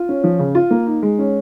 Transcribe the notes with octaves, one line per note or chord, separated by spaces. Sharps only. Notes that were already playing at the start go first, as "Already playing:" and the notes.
Already playing: F4
C#4
F3
C#3
F4
A#3
D#4
G#3
C#4